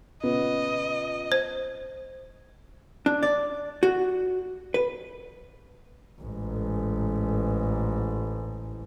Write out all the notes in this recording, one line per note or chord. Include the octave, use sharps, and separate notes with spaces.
A#2 C#3 B3 D#5
C5
D4
D5
F#4
B4
A1 G#2